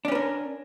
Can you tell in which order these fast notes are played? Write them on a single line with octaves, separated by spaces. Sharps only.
D4 C#4 B4 A#4